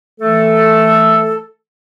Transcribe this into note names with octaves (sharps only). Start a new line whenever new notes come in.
E3 A3 A4